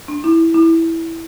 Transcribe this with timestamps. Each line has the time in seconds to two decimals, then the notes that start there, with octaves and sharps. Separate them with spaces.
0.08 D4
0.24 E4
0.54 E4